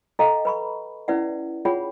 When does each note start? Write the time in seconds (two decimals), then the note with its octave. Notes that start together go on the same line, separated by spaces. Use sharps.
0.19 A4 D#5 F5 G5 A#5
0.45 B4 B5 C#6
1.08 C#4 E4 B4 D5 E5 F#5
1.65 F4 G#4 C#5 F#5 G5 B5